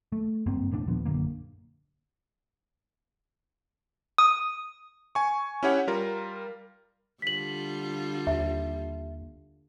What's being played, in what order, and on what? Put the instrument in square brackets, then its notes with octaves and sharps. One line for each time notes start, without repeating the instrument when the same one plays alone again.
[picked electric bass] A3
F#1 G2 A#3 C4
E1 A2 E3 D4
D#2 A#2 F3 B3
A#1 F#2 D3 A#3
[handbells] D#6
[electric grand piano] G#5 C#6
C#4 E4 G4 C#5 F#5
G3 F4 A#4
[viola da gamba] D3 G3 F4 [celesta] B6 F#7
[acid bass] D#2 [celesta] E5